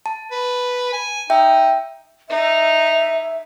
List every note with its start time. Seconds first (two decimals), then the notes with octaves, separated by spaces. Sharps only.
0.06 A5
0.32 B4
0.93 G#5
1.30 D#4 E5 G5
2.29 D#4 E5